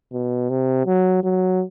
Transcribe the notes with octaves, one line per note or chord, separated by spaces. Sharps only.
B2
C3
F#3
F#3